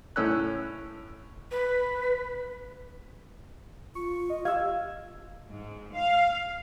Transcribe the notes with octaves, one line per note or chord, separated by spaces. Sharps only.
A2 C#4 E6 F#6
B4
F4 C#6
D#5
G4 F5 E6 G#6
G#2
F5